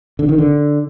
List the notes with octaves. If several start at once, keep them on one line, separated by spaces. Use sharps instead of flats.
D3
D#3
D3